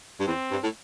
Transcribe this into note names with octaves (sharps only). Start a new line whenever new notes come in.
G2
E2 C4
G2
A2